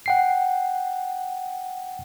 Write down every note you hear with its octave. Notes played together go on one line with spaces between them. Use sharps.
F#5 G5 C7